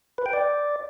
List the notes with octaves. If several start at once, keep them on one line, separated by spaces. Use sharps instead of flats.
B4
G5
D5